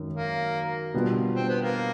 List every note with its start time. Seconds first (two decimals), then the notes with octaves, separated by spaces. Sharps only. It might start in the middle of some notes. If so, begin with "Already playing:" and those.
Already playing: G#1 F#2 D#3
0.16 A#3
0.94 B2 G3 B3 D4 F4
1.35 C4
1.49 B3
1.62 A#3